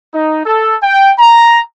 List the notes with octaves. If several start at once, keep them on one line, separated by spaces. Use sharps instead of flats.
D#4
A4
G5
A#5